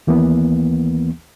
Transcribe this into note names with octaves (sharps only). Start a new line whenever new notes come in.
D#2 E3 A#3 B3